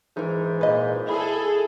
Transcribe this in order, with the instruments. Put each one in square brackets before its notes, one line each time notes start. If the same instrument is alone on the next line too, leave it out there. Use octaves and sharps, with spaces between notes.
[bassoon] G#2 [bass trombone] E3 [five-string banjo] D#4 A#4
[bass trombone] A#2 [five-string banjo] B4 D#5
[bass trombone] E4 [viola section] G#4 A4 [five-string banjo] B5